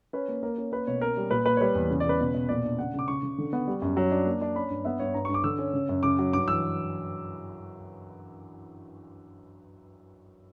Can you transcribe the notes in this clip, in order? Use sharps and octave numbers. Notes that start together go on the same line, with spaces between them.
C#4 B4
A#3
A#3 A#4
C#4
A#3 B4
B2 C#5
C#4 A#4
G3
A#2 B4
A#3 B4
C#5
G3 B4
E2
C#3
D5
C#3 B4
B2
B2
A#2 D5
D4
C#3 F#5
C#3 D6
C#3 C#6
C#3
D3
B3
G3
F#2
F#3
D4
A#3
D4
C#4 B5
G2
B3 E5
G2 C#5
G2 A#5
C#6
G2
D6
D3 E6
C#4
C#3
F#2
C#3 D6
F#3
G2 D6
E3 E6